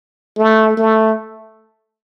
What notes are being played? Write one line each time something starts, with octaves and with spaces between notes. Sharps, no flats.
A3
A3